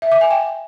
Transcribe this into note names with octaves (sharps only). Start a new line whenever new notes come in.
E5
D6
G#5
G5